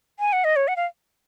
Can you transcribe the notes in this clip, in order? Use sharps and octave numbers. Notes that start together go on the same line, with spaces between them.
G#5
F#5
D#5
C#5
F#5
F5